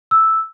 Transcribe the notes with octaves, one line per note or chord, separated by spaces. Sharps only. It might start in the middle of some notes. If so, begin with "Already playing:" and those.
E6